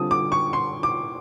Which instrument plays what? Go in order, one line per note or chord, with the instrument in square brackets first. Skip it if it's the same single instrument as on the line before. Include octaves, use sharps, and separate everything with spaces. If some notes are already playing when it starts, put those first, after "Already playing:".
Already playing: [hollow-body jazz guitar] D3 G3 C4 F4 A4 [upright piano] D#6
[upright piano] D6
C#6
C6
D6